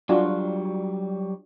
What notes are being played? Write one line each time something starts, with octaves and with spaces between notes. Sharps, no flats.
F#3 G3 D4 F4 F#4